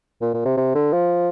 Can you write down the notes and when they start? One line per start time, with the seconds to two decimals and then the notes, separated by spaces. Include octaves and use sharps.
0.21 A#2
0.34 A#2
0.45 C3
0.57 C3
0.75 D3
0.93 F3